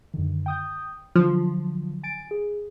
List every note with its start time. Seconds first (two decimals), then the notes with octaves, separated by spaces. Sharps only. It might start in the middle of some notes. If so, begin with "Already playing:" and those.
0.14 F#2 D3 D#3
0.46 G5 D#6 G6
1.16 D3 F3 F#3
2.03 G#5 A6 D7
2.31 G#4